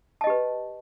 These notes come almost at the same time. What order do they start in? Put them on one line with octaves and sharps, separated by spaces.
A5 D#5 G4 B4